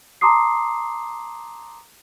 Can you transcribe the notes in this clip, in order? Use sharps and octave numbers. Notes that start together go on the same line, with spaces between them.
A5 A#5 C6 D6 D#6 C7